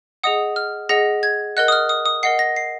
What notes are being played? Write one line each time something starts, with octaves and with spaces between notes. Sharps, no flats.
G#4 D#5 F#5 D#6
F6
G#4 D#5 F#5 A#6
G#6
A#4 D#5 F#5 F#6
D#6
F6
D#6
D#6
A#4 D#5 F#5 C7
A#6
C7